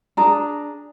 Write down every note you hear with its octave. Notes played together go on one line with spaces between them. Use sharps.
D4 G#4 A#5